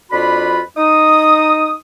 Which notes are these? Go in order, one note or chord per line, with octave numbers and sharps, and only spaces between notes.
F2 D4 F4 F#4 B4 B5
D#4 D#6